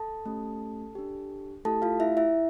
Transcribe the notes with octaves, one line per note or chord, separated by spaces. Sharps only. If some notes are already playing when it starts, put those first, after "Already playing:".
Already playing: A4 A5
A3 C#4 G4
D4 G4
A3 E4 G4 A4 A5
F4 F5
E4 E5
E4 E5